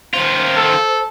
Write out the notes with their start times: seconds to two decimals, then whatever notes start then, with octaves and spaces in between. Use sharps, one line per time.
0.14 D#3 F4 C5
0.57 A4